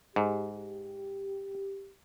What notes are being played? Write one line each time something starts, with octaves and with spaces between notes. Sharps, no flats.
G#2 G4